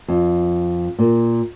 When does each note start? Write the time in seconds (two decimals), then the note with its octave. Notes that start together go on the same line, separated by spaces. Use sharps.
0.08 F2
0.99 A#2